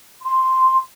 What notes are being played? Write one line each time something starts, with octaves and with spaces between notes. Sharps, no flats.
C6